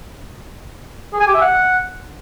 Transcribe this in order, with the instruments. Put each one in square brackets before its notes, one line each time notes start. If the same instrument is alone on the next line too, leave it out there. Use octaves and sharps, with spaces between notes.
[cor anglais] G#4
G#5
G4
E5
F#5